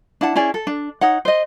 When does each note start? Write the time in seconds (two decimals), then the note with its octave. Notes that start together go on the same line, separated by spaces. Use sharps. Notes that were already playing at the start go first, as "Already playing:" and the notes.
0.21 D4 E4 F#5 A5
0.36 C#4 E4 G#4 D5
0.54 A4
0.67 D4
1.01 D#4 C#5 F#5
1.25 C5 D#5